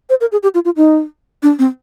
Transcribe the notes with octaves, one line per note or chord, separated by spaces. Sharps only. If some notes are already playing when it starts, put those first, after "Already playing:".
C5
A#4
G#4
G4
F4
F4
D#4
D4
C4